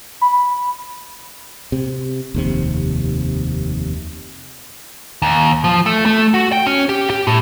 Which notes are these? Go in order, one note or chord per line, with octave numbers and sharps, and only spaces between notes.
B5
C3
F1 D#2 C3
D#2
F3
A3
A3
F#4
G5
C#4
G4
G4
A2